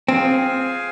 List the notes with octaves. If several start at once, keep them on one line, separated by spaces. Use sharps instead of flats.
C4 F4 G#4 C5 F5 G#5